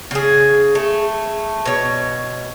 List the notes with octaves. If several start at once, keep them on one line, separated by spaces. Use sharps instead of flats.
C#3 G#4
A3
B2 C#5